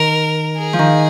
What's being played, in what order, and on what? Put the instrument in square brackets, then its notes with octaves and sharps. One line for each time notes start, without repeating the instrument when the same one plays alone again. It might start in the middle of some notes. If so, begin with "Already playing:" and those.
Already playing: [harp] D#3 [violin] A#4
[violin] G#4
[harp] F3
D#3